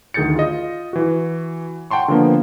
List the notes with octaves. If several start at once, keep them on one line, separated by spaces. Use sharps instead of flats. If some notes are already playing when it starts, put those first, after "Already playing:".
D2 D#3 G#4 G6 A6 C#7
F4 D#5
E3 F#4
F#5 G5 A5 C6 C#6
D3 F3 A#3 B3